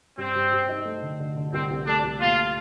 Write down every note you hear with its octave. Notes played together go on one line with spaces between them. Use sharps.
G2 C4
G2
G2
D#4
A3
D3
D3
D3
C2 C4
C2
A3 D4
C2
A#2 F4